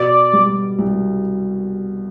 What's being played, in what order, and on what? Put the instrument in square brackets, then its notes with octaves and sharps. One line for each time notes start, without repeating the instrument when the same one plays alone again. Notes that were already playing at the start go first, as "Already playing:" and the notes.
Already playing: [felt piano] B2 [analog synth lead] D5
[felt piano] G3
C2